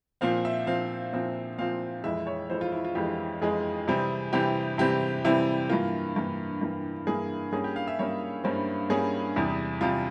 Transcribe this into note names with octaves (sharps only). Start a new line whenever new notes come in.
A#2 F3 C4 F5
E5
A#2 F3 C4 F5
A#2 F3 C4
A#2 F3 C4 F5
F2 E3 G#3 E5
C#5
F2 E3 G#3 C5
F4
E4
F4
F2 E3 G#3 G4
F2 E3 G#3 G#4
C3 E3 G3 C4
C3 E3 G3 C4 G4
C3 E3 G3 C4 G4
C3 E3 G3 C4 E4
G2 E3 A#3 F4
G2 E3 A#3
G2 E3 A#3
G2 E3 A#3 G#4
G2 G3 A#3 C#4 G#4
G4
F5
E5
G2 G3 A#3 C#4 C#5
G2 G3 A#3 C#4 C5
G2 G3 A#3 C#4 G#4
E2 C3 G3
C3 G3 F4